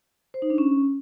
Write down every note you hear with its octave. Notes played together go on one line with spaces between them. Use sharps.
C5
D#4
D4
C#4